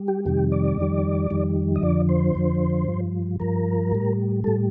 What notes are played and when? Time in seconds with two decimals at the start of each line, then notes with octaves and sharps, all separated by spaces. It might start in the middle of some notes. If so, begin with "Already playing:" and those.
Already playing: G3
0.08 G4
0.26 F2 C3 D#3 G3 G4
0.52 D5
0.77 F2 D#3 G3
1.31 F2 D#3 G3
1.76 D#5
1.82 F2 D3 F3 D5
2.09 C5
2.35 F2 D3 F3
2.87 G2 F3
3.40 G2 F3 A#4
3.92 A2 G3
4.44 A2 G3 A4